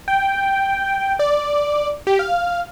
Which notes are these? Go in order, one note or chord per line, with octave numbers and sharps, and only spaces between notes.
G5
D5
G4
F5